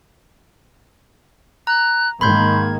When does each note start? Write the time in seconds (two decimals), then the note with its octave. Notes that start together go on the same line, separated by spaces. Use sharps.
1.67 A#5 F#6
2.21 G#2 D#3 A#3 B5 C6 G6 G#6